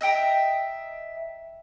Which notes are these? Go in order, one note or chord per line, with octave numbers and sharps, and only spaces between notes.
D#5 E5 G5 A#5